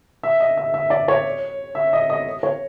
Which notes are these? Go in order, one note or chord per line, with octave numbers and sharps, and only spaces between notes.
E5
D#5
E5
E5
D5
C#5
E5
D#5
D#5
C#5